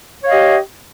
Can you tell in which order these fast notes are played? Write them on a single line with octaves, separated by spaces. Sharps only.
C#5 F5 D#5 G4